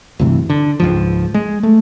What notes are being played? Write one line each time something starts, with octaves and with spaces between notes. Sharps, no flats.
D2 G2 C3 E3
D3
C#2 G#2 F3
G#3
A3